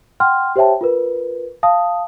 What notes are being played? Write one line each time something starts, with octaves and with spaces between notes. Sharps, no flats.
F#5 G5 C6 F6
G4 C5 C#5 E5 G5 A5
F4 A#4 B4
F5 A5 D#6